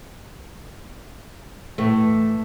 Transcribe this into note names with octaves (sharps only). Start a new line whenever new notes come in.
A2 E3 A3